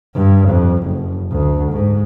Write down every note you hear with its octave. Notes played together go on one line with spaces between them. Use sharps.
G2
F2
F#1
D2
G#2